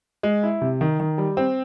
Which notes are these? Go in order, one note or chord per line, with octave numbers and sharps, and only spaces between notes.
G#3
E4
C3
D#3
D#3
G3
C4